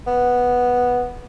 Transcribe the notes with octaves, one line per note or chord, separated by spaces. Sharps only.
B3